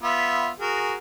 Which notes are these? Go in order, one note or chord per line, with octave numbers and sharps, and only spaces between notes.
B3 F4 E5
F#4 G#4 A#4